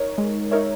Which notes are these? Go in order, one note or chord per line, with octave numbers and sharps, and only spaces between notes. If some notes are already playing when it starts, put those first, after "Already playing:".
Already playing: D#4 A#4 C#5
G#3
D#4 A#4 C#5 E5